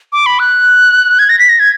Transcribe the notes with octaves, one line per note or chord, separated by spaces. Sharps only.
D6
B5
F#6
G#6
A#6
B6
A#6
G#6